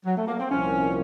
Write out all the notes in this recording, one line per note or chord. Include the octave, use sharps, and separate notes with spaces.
F#3
A3
A#3
C4
C2 A#2 F3 A#3 C#4